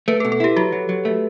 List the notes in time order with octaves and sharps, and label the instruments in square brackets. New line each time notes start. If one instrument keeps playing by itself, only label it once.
[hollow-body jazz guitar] A3 [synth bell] B4
[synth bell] A4
[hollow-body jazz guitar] B2
[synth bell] A4
[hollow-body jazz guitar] E4 [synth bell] G4
[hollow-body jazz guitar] F#3 [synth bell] F#4
[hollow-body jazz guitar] F#3
F#3
A3